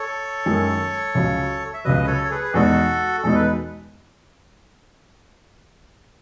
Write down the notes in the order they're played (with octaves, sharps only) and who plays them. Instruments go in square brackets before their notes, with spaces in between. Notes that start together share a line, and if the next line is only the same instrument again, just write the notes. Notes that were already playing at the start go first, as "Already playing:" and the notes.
Already playing: [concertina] A4 C#5
[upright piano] F#2 D#3 G#3
C#2 C#3 F#3
[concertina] E5
[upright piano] C#2 C#3 F#3 [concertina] B4 D#5
[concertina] B4
A4 C#5
C#5
G#4 B4
B4
[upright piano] E2 B2 G#3 D#4 [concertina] F#4 A4
[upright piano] E2 B2 G#3 D#4 [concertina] A4
[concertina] B4